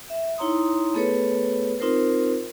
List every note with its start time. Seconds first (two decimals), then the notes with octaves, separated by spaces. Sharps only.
0.10 E5
0.38 D#4 E4 C#5 A#5 C6 D#6
0.94 A3 B3 G#4 A4 B4 C#5
1.80 C4 D#4 F4 A#4 C5